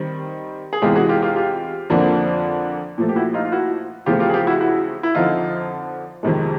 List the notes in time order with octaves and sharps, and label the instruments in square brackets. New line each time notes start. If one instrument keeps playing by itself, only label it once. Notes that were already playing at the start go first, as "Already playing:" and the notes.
Already playing: [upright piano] D#3 G3 C4
[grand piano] G#4
[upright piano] E2 C3 E3 G#3 [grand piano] F4 G4
[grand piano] F#4 G#4
F4 G4
F4 G4
F4 G4
[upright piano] F2 D3 F3 A#3 D4
A#2 F3 A3
[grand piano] G4
E4 F#4
D#4 F4
F4
E4 F#4
[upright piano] E2 C#3 F3 A3 C4 [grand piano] F4 G4
[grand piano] F4 G4
G#4
F4 G4
E4 F#4
E4 F#4
E4
[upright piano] F2 D3 F3 [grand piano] D#4 F4
[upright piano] F2 C3 D#3 G#3